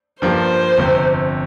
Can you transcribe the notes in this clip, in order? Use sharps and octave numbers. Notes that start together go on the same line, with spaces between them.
G2 F3 A#3 G4 C5
G1 F2 C3